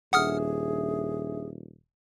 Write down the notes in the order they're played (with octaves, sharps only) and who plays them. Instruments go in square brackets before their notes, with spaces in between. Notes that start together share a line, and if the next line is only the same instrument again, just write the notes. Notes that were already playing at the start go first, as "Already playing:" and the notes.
[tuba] D#1 [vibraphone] D4 A4 E5 [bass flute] G#4 [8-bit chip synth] F#5 D#6 F6